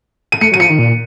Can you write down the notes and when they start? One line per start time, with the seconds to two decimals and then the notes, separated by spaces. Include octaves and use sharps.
0.32 D#7
0.41 A3 C#7
0.52 F#3 D#7
0.60 F3 C#7
0.70 D#3
0.79 A#2